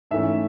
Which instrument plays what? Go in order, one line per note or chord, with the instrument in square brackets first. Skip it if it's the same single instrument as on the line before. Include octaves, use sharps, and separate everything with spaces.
[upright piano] G#2 E3 A3 C#4 E5